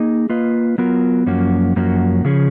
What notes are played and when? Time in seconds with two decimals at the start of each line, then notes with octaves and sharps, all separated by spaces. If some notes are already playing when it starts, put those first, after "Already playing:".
Already playing: A#3 D#4 G#4 D#5
0.30 A#3 F4 B4 D#5
0.78 F#3 B3 F4 A#4
1.26 F#2 F3 A#3 C#4 F#4
1.76 F#2 F3 A#3 C#4 F#4
2.24 C#3 F3 C#4 G#4